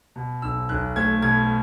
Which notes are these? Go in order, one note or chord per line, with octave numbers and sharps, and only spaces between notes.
B2
B1 E6
B1 F#6
A3 G#6
B2 G#6